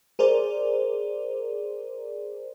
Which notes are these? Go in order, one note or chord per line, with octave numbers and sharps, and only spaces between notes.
G#4 A#4 C5 D5